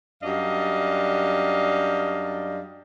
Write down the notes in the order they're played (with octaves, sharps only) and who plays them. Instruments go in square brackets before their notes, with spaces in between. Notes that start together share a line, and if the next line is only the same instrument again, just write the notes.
[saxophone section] F#2 G3 D4 D#5 F5